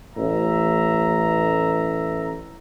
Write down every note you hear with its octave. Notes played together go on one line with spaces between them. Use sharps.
A1 E5 A#5